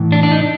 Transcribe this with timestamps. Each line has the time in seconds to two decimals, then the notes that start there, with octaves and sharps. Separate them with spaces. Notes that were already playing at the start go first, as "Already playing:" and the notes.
Already playing: A2 E3
0.12 D4
0.23 D4
0.31 D#4